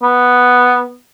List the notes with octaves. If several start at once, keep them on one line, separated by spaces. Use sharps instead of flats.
B3